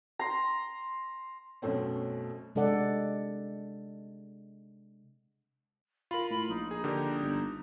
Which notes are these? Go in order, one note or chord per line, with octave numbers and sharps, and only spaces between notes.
A#5 C6
F#2 B2 A3 C4 C#4
C3 G#3 D4 A4 D5 F#5
F4 A#4 B5
A2 B5
A#1 D#4
G#4
D3 G4 A#4
G1